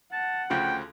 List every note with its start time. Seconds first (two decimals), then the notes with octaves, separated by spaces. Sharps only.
0.13 F#5 A5
0.50 D2 C#3 F3 G5